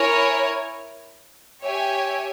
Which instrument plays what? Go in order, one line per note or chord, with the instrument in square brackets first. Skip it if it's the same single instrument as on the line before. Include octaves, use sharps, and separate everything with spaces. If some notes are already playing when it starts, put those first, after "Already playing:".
Already playing: [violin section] E4 A#4 C#5 G#5
G4 C#5 E5 G#5